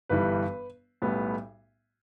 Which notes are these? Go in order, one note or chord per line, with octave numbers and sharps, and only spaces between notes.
G1 G2 E3 G3 B4
B1 A2 G3 B3